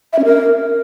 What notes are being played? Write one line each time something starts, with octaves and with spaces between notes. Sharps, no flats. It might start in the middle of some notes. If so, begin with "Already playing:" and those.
E5
C#4
A#4